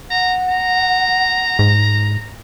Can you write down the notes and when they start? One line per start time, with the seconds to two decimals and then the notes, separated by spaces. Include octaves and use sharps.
0.10 F#5 A#5
0.49 A#5
1.59 G#2